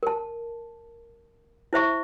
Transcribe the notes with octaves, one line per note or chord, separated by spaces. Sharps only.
A#4 A5
E4 C5 E5 C#6